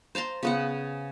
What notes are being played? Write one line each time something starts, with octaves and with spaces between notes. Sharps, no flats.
C5 A5 A#5 C6
C#3 B3 F#5